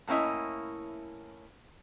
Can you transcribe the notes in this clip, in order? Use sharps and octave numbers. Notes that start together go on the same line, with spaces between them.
A2 A#3 C#4 E4 D#5